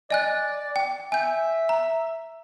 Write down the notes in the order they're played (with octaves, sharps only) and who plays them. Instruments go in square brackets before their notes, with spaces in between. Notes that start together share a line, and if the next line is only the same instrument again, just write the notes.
[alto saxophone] D5 [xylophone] D#5 G#5 F#6
[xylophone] G5
[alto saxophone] E5 [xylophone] G#5 G6
[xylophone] A#5